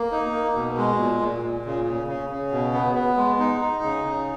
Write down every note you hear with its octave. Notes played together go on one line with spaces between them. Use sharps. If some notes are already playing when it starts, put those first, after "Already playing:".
Already playing: A#3
D#4
A#3
B2
G#3
A#2
A#2
A#2
C#3
C#3
C#3
C#3
B2
B3
B3
G#3
D#4
D#4
C#3
C#3